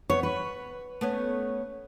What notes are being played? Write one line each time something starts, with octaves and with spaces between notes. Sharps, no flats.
B3 C#5
B4
A3 B3 C#4